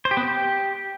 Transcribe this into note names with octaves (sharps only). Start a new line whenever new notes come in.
C5
G4
B3
G4